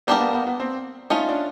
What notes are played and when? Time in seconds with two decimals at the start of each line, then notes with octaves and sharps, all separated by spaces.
0.07 G3 A#3 B3 D4 G4 A#4
0.20 B3
0.33 B3
0.47 B3
0.60 C4
1.10 A3 C#4 D#4 F4
1.29 D4